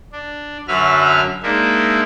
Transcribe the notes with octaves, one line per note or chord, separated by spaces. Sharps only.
D4
F#2 D3 F#3 B4 E5 F6
G#3 A#3 D4 D#4 E5